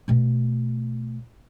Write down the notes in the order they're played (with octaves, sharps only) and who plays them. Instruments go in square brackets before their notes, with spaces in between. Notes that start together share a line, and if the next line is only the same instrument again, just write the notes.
[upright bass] B2 A3